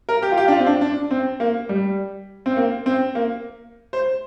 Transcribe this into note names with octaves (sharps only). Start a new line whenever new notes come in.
A#4
G4
F4
G4
D4
F4
C4
D4
D4
C4
A#3
G3
C4
A#3
C4
A#3
C5